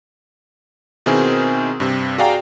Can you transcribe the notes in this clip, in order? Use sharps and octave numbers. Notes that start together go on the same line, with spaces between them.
B2 D#3 C4 E4 G#4 A#4
G2 C3
F#4 G#4 D5 F5 G5 A#5